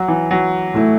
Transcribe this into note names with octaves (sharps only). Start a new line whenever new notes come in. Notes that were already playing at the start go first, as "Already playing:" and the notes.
Already playing: F#3
E3
F#3
A2 A3 E4